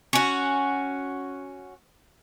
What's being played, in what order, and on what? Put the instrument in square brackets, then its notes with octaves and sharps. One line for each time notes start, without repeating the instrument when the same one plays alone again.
[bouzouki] C#4 F#4